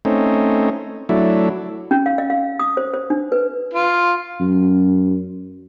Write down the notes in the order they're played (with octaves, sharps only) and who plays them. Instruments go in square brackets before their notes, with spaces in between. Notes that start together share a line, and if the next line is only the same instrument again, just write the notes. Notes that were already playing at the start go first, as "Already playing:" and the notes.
[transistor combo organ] A3 C4 C#4 D#4
F#3 A3 D4 E4
[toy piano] C#4
F5
D#5
F5
D#6
C5
C5
D4
B4
[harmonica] F4
[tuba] F#2